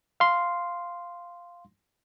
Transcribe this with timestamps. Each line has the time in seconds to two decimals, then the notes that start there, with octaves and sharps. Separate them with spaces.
0.20 F5 C6